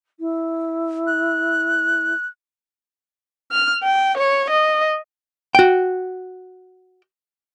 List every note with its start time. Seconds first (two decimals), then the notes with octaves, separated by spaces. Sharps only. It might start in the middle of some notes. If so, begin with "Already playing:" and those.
0.19 E4
1.07 F#6
3.52 F6
3.83 G5
4.17 C#5
4.50 D#5
5.55 F#4 G5